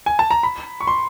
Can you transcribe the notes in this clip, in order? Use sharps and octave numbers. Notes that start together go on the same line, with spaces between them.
G#5
A5
A#5
B5
C#6
C6